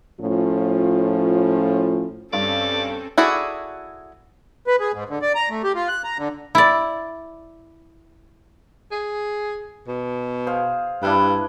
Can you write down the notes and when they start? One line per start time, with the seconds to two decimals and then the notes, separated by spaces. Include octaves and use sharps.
0.20 A2 F3 C#4 F4
2.33 G2 C4 C#4 A4 D5
3.18 E4 F#4 G#4 A4 D5
4.67 B4
4.80 G#4
4.93 G#2
5.09 D3
5.22 D5
5.35 A#5
5.50 A3
5.64 G4
5.75 F4
5.88 F#6
6.04 A#5
6.18 D3
6.55 E4 D5
8.91 G#4
9.88 B2
10.47 G#4 C5 F5
11.03 G2 D4 E4 B4